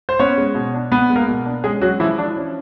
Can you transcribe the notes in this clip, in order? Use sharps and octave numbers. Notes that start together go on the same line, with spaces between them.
C5
B3 C#4 C#5
G#3
B2
D4
B3 B4
G#3
A#3 A#4
B2
D4
G#3 C#4 G#4
F#3 G#3 F#4
E3 F3 E4
F3 D4
C#4